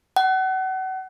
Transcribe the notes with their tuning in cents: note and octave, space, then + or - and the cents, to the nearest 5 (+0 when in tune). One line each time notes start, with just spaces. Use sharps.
F#5 +35